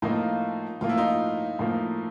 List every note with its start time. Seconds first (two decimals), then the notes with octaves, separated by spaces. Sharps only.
0.02 A2 F3 A#3 D#4 F4
0.81 A2 F3 A#3 F4
0.89 E4
0.97 D#4 F4
1.59 A2 F3 A#3